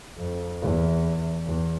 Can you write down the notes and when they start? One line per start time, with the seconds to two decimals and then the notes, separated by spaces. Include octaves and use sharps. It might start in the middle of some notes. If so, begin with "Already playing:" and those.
0.18 F2
0.61 E2
1.47 E2